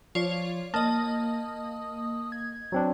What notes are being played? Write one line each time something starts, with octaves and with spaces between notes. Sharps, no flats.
F3 F4 C#5 D5
A#3 D#5 A5 D#6
G#6
F#3 C4 D4